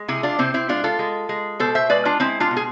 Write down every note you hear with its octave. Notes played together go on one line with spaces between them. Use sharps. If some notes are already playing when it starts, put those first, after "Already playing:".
Already playing: G#3
C3 E4 G#4
D4 F4
C3 C4 E4
C4 E4
G#3 D4 F4
F4 A4
G#3
G#3
B2 A4 C5
C5 E5
G#3 B4 D5
D4 F4
G#3 C4 E4
D4 F4
B2
G#4